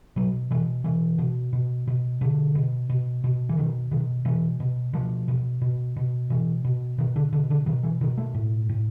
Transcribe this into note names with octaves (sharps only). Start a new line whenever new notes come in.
B2 F#3
B2 E3
B2 E3
B2
B2
B2
B2 D3
B2
B2
B2
E3
B2 D#3
B2 D#3
B2 E3
B2
B2 F3
B2
B2
B2
B2 E3
B2
B2 D#3
D3
B2 D3
D3
B2 D#3
E3
B2 D#3
A3
A2
A2